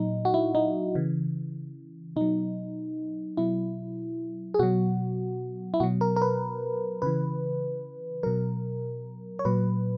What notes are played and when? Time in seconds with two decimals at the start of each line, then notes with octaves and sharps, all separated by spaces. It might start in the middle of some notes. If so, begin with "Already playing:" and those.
Already playing: A#2 F#3 D#4
0.25 F#4
0.34 E4
0.55 D#4
0.95 C#3 E3
2.16 B2 F#3 D#4
3.37 B2 F#3 E4
4.54 G#4
4.59 B2 F#3 F#4
5.74 E4
5.80 B2 F#3 F#4
6.01 A#4
6.16 A#4
6.22 B4
7.02 C#3 E3 B4
8.23 B2 F#3 A#4
9.39 C#5
9.45 A#2 F#3 B4